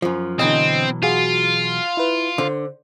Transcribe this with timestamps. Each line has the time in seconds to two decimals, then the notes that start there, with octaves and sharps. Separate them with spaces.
0.02 F#2 F3
0.39 B2 D3 E3 F#3 C4 D#5
1.03 F4 F#4 G#4 F5
1.97 E4 B4
2.38 D3 C5